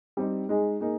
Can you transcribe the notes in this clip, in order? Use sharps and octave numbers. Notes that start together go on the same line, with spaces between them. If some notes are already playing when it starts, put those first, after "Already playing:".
G3 C4 D#4
G#3 D#4 G#4
A#3 D#4 G#4